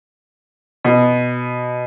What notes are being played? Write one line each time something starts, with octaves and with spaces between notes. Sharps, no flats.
B2